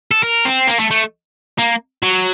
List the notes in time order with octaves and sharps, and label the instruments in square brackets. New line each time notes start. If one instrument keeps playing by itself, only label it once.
[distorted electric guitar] A4
A#4
C4
A#3
A3
A3
A#3
F#3